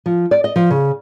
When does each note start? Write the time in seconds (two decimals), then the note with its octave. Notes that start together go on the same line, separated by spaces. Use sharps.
0.06 F3
0.31 D5
0.44 D#5
0.56 F3
0.70 C#3